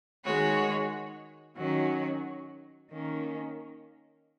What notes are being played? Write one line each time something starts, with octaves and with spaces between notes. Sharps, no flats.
D#3 G#3 F#4 C#5
D#3 F#3 C#4 F#4
D#3 A#3 C#4